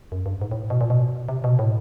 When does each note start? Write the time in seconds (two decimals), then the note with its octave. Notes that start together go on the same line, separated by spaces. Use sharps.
0.12 F#2
0.26 G2
0.41 G#2
0.51 A2
0.70 B2
0.81 A#2
0.90 B2
1.29 C3
1.44 B2
1.59 A2